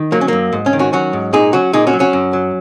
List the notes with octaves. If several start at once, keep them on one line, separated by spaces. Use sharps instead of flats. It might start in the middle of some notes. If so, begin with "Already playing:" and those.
Already playing: D#3
F#3 A#3
C#4
F#2 A#3
G#2
C#4
D#3
C#4 F#4
F#3 C#4 F#4
G#2
A#2 D#4 G#4
F#3 C#4 F#4
A#2 D#4 G#4
C#4 F#4
F#3
C#4 F#4
F#2
F#3